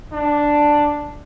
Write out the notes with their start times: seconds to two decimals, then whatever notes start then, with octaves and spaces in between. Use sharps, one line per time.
0.12 D4